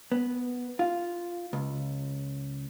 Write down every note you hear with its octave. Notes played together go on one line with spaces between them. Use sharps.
B3
F4
C#2